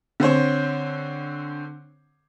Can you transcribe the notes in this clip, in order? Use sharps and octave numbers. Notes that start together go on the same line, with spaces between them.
D3 C4 C5 C#5